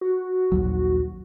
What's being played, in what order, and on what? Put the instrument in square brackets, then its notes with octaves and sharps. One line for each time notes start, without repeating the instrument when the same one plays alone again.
[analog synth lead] F#4
[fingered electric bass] A#1 D#2 F#3